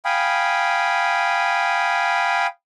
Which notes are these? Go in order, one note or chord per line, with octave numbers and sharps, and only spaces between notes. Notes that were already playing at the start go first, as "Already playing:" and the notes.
F5 G5 G#5 B5 D#6